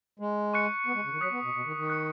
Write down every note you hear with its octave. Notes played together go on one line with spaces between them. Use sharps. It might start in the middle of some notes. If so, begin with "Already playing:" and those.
G#3
C#6 F#6 C#7
B3
G#3
C#3
D#3
F#3 D#6 F#6 B6
B3
B2
B2
D#3
D#3
D#6 F#6 C#7